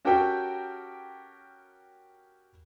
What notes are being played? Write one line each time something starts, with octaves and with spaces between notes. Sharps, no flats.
C#4 F#4 G4 A4 A#4 G5